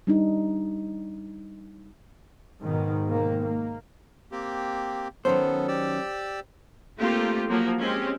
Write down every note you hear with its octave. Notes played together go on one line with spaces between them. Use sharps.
G3 D4 D#4
G#2 B2 D#3
G#2 D#3 A#3
A#3
A#3 C4 G4
D#3 F#3 B3 C#4 A4 C5
G4 D5 E6
A3 A#3 C4 F4 G4
F3 F#3 A#3
G#3 C4 C#4 G4